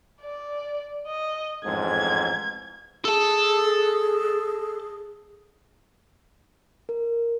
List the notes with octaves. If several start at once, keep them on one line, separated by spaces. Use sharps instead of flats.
D5
D#5
A1 F2 G#2 G#6
G#4 A4 A5
A#4